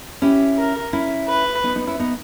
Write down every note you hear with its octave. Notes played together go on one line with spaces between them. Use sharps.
C#4 E4 G4
A#4
C#4 E4
B4
B3 D#4
B3 D#4
C#4 E4
B3 D#4